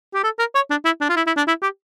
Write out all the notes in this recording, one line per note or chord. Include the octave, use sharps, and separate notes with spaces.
G4
A4
A#4
C#5
D4
E4
D4
F4
E4
E4
D4
E4
G4